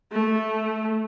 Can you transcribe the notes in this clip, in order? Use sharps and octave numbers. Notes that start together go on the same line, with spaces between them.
A3